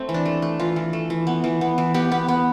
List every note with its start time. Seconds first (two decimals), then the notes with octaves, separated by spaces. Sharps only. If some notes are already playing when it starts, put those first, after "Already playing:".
Already playing: A3 C4
0.09 E3
0.14 D4
0.25 A3
0.42 A3
0.60 E3 F4
0.76 E3
0.93 A3
1.10 E3
1.27 B3
1.44 E3
1.61 B3
1.78 E3
1.94 B3 G4
2.12 B3
2.28 B3